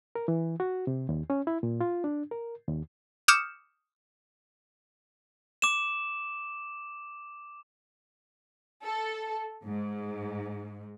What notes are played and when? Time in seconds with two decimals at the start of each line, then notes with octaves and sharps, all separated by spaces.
0.15 A#4
0.28 E3
0.60 F#4
0.87 C3
1.09 D#2
1.30 C#4
1.47 E4
1.63 A#2
1.81 F4
2.04 D4
2.31 A#4
2.68 D#2
3.28 D6 D#6 F6 G6 C#7 E7
5.62 D6 E7
8.84 A4
9.65 G#2